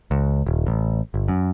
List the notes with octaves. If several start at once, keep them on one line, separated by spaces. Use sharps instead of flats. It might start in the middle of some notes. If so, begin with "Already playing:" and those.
C#2
D#1
A1
G1
F#2